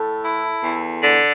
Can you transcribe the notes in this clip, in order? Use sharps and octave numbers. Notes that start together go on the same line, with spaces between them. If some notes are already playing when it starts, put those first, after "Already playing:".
Already playing: A2 A4
E4
E2
D3